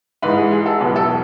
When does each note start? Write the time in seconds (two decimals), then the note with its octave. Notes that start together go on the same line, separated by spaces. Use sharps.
0.22 G#2 E3 G#3 B4
0.37 G#4
0.51 G#4
0.66 A4
0.80 E2 B2 F#3 B4
0.96 A4